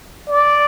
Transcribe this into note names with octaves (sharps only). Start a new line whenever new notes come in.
D5